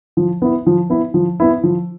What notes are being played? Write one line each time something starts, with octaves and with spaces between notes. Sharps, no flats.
F3
B3 E4
F3
B3 E4
F3
B3 E4
F3